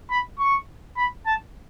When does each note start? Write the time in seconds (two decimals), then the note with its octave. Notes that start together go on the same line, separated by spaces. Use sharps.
0.11 B5
0.39 C#6
0.97 B5
1.26 A5